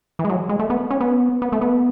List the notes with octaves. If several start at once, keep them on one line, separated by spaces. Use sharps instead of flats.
E3
G#3
F#3
G#3
A3
B3
C#4
B3
B3
A3
B3